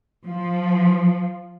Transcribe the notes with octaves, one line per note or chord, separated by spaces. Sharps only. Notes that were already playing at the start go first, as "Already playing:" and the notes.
F3